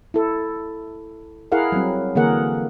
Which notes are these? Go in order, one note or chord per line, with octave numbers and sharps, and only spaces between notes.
E4 A4
E4 G#4 A#4 F5 F#5
F#3 G3 C4
D3 E3 A#3 G#4 A#4 F#5